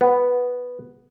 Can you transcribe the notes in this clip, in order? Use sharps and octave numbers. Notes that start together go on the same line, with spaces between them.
B3